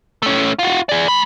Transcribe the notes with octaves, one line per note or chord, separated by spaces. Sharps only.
A3 C#4
F4 F#4
G#4 D5
G#3 B5